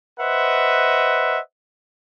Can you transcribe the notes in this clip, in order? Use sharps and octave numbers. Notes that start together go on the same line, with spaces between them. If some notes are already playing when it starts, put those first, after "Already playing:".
B4 C5 D#5 E5 F#5